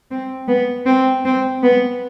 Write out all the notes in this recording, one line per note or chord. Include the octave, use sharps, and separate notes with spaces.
C4
B3
C4
C4
B3